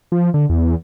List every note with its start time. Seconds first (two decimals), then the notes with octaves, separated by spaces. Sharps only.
0.12 F3
0.34 D3
0.49 E2